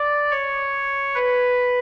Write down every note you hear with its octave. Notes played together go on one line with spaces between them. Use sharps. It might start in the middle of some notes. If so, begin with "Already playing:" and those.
Already playing: D5
C#5
B4